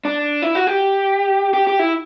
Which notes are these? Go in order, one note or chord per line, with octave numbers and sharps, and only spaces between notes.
D4
E4
F#4
G4
G4
G4
E4